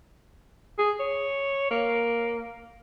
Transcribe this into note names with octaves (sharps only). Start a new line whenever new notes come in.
G#4
C#5
A#3